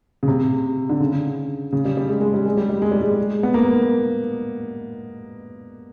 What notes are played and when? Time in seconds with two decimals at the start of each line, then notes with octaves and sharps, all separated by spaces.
0.23 C#3
0.28 C3
0.89 D3
1.00 C#3
1.73 C#3
1.85 G3
1.97 G3
2.09 G#3
2.21 G#3
2.34 G3
2.46 G#3
2.57 G3
2.70 G3
2.82 G#3
2.92 G3
3.01 G#3
3.43 B3
3.54 A#3